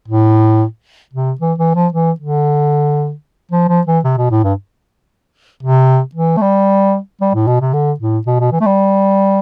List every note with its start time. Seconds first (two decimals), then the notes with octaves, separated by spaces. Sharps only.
0.08 A2
1.14 C3
1.41 E3
1.58 E3
1.75 F3
1.93 E3
2.20 D3
3.52 F3
3.69 F3
3.87 E3
4.05 C3
4.18 B2
4.31 A2
4.44 G2
5.63 C3
6.15 E3
6.37 A3
6.42 G3
7.21 G3
7.35 A2
7.47 B2
7.61 C3
7.74 D3
8.00 A2
8.27 B2
8.40 B2
8.52 E3
8.61 A3
8.66 G3